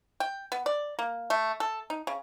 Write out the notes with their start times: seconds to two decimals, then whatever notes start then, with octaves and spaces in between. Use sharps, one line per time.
0.20 G5
0.52 B3
0.66 D5
0.99 A#3
1.30 A3
1.60 A4
1.90 D#4
2.07 C#3